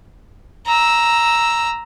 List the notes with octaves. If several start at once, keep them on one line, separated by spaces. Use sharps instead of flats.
A#5 E6